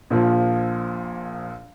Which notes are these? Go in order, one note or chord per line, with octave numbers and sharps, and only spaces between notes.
A#1 A#2 F3